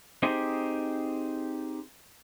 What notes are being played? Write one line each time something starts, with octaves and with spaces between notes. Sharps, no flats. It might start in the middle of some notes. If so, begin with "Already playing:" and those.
C4 D#4 G4 G#4 C5